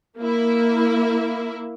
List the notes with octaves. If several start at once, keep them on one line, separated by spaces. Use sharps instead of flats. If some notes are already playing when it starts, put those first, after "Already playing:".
A#3 E4